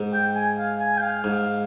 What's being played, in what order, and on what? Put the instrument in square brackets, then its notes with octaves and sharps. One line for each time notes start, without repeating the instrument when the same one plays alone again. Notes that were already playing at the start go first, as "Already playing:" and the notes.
Already playing: [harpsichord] G#2
[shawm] G5
G#5
F5
G#5
G5
F5
[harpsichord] G#2